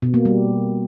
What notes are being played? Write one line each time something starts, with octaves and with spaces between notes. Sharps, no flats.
B2
A#3
G3